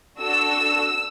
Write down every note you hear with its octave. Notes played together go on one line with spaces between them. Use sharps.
D4 F#4 A4 E6